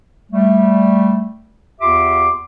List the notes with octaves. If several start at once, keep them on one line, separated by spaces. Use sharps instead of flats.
G3 A3
E2 F4 G4 E5 C6 D6